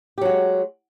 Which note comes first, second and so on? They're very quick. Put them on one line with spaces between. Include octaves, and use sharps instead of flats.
G4 F#3 F#4 G#3